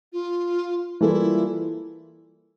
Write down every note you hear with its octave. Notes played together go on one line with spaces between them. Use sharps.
F4
E3 G3 A#3 E4 F4 A4